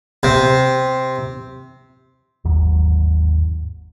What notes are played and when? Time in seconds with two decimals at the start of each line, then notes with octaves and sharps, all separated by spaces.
0.23 C3
2.45 G1 D#2 G#2 F#3